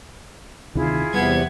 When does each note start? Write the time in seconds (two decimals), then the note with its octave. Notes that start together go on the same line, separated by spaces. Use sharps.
0.75 D2 C3 D#3 E4 F4 G#4
1.13 E2 C3 G3 B3 G#6